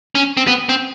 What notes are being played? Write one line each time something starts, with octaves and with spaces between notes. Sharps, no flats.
C#4
C4
B3
C4